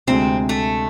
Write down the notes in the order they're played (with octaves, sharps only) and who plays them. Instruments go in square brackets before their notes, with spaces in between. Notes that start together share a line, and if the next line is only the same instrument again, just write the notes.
[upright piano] D2 C3 G#3 [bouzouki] C4
[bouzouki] A3